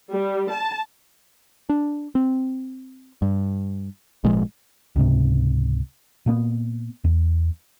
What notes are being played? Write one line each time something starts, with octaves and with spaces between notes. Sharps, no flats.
G3
A5
D4
C4
G2
G#1 A#2 F3 G#3
C#2 G#2 C3
A#2 A#3 B3
E2